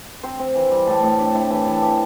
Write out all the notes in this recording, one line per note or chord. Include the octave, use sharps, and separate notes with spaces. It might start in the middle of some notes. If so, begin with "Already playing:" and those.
C4 C5
C4
E3
G3
A2 A4
A2 A4
D4 G4
A2 E4
E3 G4
E3 A4
E3 G4